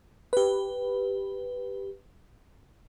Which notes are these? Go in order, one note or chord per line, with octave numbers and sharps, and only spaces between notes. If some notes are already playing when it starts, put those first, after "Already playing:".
G4 B4